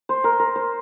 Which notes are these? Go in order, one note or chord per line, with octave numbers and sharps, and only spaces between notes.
C5
A#4
A#4
C5